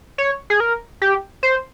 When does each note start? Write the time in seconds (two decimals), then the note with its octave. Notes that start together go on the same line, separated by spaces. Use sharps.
0.18 C#5
0.50 G#4
0.60 A#4
1.02 G4
1.43 C5